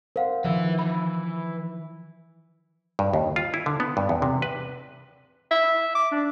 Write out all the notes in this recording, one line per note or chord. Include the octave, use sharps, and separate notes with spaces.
A#4 C5 F5 F#5
D#3 F3 B4 E5
E3 B5
G2
D#2
F4
E4
D3
B3
G2
E2
C3
B4
E5
D6
D4